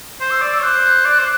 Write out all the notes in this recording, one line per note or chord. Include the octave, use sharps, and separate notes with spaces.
C5 C6
E6
D5 D6
E6
C5 F#6
D5
C5